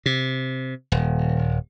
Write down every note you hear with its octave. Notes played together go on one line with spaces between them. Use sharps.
C3
D#1